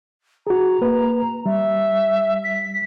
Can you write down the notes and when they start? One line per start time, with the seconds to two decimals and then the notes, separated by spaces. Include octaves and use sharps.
0.47 F#4 G#4 A#5
0.81 A#3 B4
1.46 G3 E5
2.44 B6